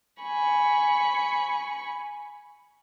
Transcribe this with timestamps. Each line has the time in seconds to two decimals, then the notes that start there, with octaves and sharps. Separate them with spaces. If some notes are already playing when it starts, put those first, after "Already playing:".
0.22 G#5 B5 C#6